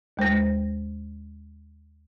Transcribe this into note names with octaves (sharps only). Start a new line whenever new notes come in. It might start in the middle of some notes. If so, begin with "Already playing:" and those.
D#2 G#3 C5 A#6